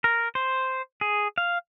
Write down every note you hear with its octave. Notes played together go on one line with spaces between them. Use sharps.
A#4
C5
G#4
F5